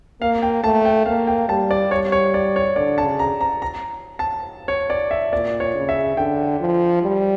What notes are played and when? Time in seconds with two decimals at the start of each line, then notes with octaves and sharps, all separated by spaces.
0.21 A#3 F5
0.42 G5
0.64 A3 A5
0.85 G5
1.06 A#3 F5
1.27 G5
1.48 G3 A5
1.71 D5
1.91 G3 C#5
2.12 C#5
2.34 D5
2.56 C#5
2.76 D3 D5
2.98 A5
3.05 C#3
3.19 A#5
3.41 A#5
3.62 A#5
4.19 A5
4.68 C#5
4.90 D5
5.11 E5
5.32 A#2 D5
5.60 C#5
5.75 C#3
5.89 E5
6.17 D3 G5
6.60 F3
7.03 G3